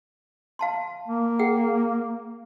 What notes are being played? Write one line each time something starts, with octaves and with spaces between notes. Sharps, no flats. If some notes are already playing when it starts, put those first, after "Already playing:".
F5 A5 C6
A#3
G#4 F#5 G5